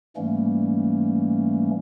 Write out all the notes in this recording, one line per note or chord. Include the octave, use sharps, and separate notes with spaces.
G#2 E3 G3 A3 A#3 C#4